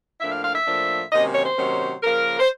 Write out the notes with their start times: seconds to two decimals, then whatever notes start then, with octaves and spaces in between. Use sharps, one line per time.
0.21 A2 F3 A#3 D4 E5
0.32 F5
0.44 F5
0.55 E5
0.66 A2 F3 A#3 D4
1.12 C3 D#3 F#3 A#3 C#4 D#5
1.35 C#5
1.45 C5
1.57 C3 D#3 F#3 A#3 C#4
2.03 C#3 F3 A#3 A#4
2.39 C5